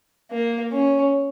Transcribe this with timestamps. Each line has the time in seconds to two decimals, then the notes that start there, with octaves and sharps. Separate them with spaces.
0.32 A#3
0.72 C#4